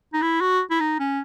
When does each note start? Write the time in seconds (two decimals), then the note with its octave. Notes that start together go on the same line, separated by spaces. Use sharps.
0.13 D#4
0.22 E4
0.41 F#4
0.71 E4
0.80 D#4
1.00 C#4